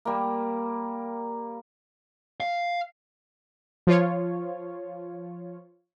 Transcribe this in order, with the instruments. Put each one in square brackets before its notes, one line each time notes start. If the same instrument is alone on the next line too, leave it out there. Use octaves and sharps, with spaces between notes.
[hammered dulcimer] G3 A#3
[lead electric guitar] F5
[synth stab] F3 F4 C#5